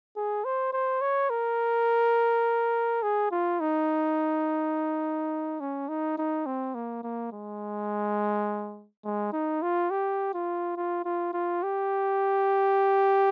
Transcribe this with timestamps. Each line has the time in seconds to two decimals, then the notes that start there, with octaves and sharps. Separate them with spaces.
0.17 G#4
0.45 C5
0.73 C5
1.01 C#5
1.30 A#4
3.03 G#4
3.32 F4
3.60 D#4
5.61 C#4
5.89 D#4
6.18 D#4
6.46 C4
6.75 A#3
7.03 A#3
7.33 G#3
9.05 G#3
9.33 D#4
9.62 F4
9.90 G4
10.34 F4
10.77 F4
11.05 F4
11.33 F4
11.63 G4